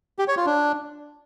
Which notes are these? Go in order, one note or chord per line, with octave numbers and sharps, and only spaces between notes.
G4
C#5
F4
D4